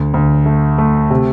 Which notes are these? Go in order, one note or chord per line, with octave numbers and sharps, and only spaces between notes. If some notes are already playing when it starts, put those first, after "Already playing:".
Already playing: D2
D2
A3
A3
C3